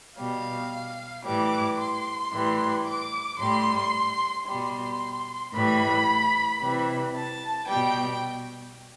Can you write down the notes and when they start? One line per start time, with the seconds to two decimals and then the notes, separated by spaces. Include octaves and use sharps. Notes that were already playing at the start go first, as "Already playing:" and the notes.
0.17 B2 G3 F5
1.24 A2 E3 G3 D6
1.77 C6
2.32 A2 E3 G3
2.85 D6
3.38 A2 G3 C6
4.46 B2 G3 C6
5.52 A2 E3 G3 B5
6.61 C3 E3 G3
7.14 A5
7.67 B2 G3 G5